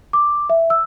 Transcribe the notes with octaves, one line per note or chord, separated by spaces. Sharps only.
D6
E5
E6